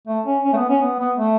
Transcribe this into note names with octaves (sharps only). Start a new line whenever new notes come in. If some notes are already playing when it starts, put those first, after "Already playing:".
A3
C#4
C#4
A3
B3
C#4
B3
B3
A3